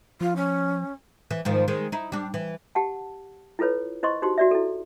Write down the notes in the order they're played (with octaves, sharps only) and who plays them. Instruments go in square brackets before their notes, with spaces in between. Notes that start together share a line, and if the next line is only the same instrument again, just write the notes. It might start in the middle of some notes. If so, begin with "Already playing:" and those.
[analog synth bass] F3 [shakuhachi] F4
[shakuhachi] C#4
[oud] E3
G#2 D#3 F3
D#3 G#3
D#4 E4
G3 D4
E3
[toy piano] G4 F#5 A5
E4 F4 A4 B4 C#5
E4 C5 D#5 C6 C#6
D#4 F#4 G4 C5 C6
F#4 D5 E5
E4 A4